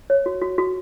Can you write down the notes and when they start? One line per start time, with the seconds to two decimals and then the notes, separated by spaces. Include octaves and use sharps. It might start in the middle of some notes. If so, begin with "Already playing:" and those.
0.10 C#5
0.26 F#4
0.42 F#4
0.58 F#4